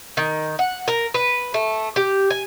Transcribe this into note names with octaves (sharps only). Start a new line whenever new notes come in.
D#3
F#5
A#4
B4
A3
G4
G#5